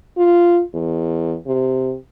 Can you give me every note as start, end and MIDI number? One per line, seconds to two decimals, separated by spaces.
0.17 0.61 65
0.74 1.36 40
1.46 1.96 48